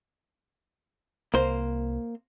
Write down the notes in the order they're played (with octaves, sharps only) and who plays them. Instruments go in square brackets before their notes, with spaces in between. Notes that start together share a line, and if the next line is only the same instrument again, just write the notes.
[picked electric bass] C2 [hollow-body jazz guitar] A#3 C5